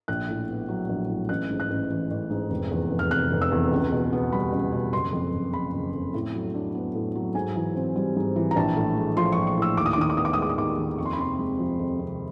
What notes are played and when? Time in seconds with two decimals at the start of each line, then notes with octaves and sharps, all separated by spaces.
0.08 A#1 F#6
0.28 A2
0.49 B3
0.68 F#3
0.89 A#1
1.09 A2
1.29 A1 F#6
1.50 G#2
1.60 F#6
1.70 A1
1.90 E3
2.11 A1
2.31 G#2
2.50 F1
2.71 E2
2.91 F1
2.99 F6
3.11 C3 F#6
3.32 F1
3.41 E6
3.52 E2
3.72 C#2
3.92 B2
4.13 B3
4.32 G3 B5
4.52 C#2
4.72 B2
4.93 F#1 C6
5.12 F2
5.33 F#1
5.54 C#3 B5
5.74 F#1
5.94 F2
6.14 A2
6.34 F#3
6.54 D4
6.75 B3
6.95 A2
7.15 F#3
7.35 G#2 G#5
7.55 E3
7.76 C4
7.96 G3
8.16 G#2
8.36 E3
8.51 A#5
8.56 A#1 A5
8.77 A2
8.97 G#3
9.17 F3 C6
9.32 C#6
9.37 A#1
9.47 C#6
9.57 A2 E6
9.77 D#2 D6
9.86 D#6
9.93 D6
9.98 D#3 D#6
10.10 D6
10.17 B3 D#6
10.25 D6
10.33 D#6
10.38 G#3 D6
10.49 D#6
10.58 D#2 D6
10.78 D#3
10.98 F2 C#6
11.06 C6
11.13 B5
11.18 C3 C6
11.39 G#3
11.59 F3
11.79 F2
11.99 C3